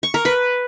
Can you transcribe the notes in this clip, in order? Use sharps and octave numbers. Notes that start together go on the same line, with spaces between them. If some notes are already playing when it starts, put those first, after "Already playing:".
C#6
A#4
B4